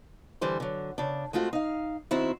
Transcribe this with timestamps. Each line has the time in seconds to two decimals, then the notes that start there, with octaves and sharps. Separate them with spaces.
0.41 D3 E3 G3 C5
0.60 D3 F#3
0.98 C#3 D4
1.33 G#3 A3 C4 F4 F#4
1.53 D#4 F5
2.11 D#3 C4 E4 F#4